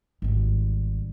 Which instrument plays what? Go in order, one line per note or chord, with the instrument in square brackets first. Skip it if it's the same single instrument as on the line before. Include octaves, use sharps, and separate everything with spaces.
[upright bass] G#1 G3